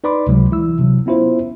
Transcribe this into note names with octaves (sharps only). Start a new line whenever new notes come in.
D#4 B4 D5 B5 C6 D6
C#2 C3 F#3 G#3
E3 E4 E6
C3 F#3
B3 C#4 E4 F4 C5